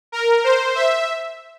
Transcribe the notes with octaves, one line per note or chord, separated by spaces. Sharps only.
A#4
C5
E5